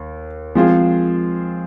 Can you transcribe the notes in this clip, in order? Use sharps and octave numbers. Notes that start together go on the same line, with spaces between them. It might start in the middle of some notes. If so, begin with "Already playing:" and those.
Already playing: D#2
F3 G#3 C4 F4 G#4